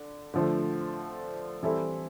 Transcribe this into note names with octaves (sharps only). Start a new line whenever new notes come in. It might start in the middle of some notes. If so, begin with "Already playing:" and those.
Already playing: D3
D3 F3 A3
E3 G3 C4 E4 A4